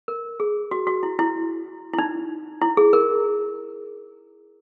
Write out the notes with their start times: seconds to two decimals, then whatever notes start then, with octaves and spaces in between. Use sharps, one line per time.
0.08 A#4
0.40 G#4
0.71 F#4
0.87 F#4
1.03 E4
1.19 E4
1.93 E4
1.98 D#4
2.61 E4
2.77 G#4
2.93 A#4